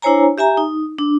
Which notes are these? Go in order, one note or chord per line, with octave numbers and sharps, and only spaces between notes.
D4 E4 C5 C#5 G#5 A#5
G4 E5 G#5 A#5
D#4
D4